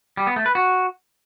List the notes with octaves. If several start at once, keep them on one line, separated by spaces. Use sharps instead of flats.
G3
B3
A3
B4
F#4